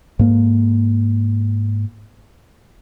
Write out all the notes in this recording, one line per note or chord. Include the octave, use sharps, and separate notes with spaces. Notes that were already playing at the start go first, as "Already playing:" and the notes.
G#2 A#3